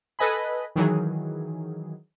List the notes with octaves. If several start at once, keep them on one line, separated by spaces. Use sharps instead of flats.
A4 B4 D#5 G#5 B5
D#3 E3 F#3 G#4